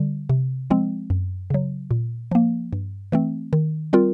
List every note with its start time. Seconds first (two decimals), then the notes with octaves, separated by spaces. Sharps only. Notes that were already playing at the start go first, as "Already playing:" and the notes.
Already playing: D3 G3
0.29 C3
0.70 F3 G#3 C4
1.10 F#2
1.50 C#3 F#3
1.91 A#2
2.31 F3 A#3
2.73 G2
3.12 E3 A3 C4
3.53 D#3
3.93 G3 C4 F4 A#4